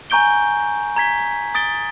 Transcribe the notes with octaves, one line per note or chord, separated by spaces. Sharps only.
G#5 A#5 C#6 G6 D7 G7
A#5 G#6 B6 G7
D#6 A6 D7 G7